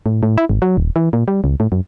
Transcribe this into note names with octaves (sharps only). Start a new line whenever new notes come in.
A2
A2
E4
G#1
F#3
D#1
E3
A#2
G3
C#2
A2
F#2